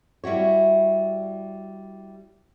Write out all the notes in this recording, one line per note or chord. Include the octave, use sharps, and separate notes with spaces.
G3 E4 F#4 C#5